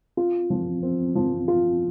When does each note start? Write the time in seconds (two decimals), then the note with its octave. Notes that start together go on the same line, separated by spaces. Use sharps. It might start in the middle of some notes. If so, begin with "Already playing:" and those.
0.17 F4
0.50 F3
0.83 C4
1.15 F3
1.48 F4